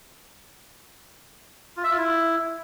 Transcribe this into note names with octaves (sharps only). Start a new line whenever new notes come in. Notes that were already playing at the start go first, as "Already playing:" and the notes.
F4
E5
F4
E4